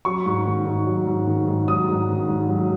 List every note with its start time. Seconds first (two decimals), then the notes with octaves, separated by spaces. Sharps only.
0.05 F#3 C#6
0.26 G#2
0.46 D#3
0.67 G#2
0.87 F#3
1.07 G#2
1.27 D#3
1.48 G#2
1.68 F#3 D#6
1.88 G#2
2.09 D#3
2.29 G#2
2.49 F#3